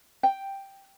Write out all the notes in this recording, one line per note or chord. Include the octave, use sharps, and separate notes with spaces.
G5